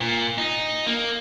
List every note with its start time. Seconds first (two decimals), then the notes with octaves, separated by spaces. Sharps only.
0.01 A#2
0.38 D#4
0.86 A#3